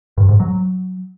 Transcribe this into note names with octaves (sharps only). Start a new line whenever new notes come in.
G2
G#2
F#3